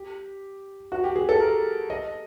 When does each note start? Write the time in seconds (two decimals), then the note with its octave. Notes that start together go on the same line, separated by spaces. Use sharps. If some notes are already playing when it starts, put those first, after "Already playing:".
Already playing: G4
0.92 F#4
1.04 G4
1.16 G#4
1.29 A4
1.40 A#4
1.90 D#5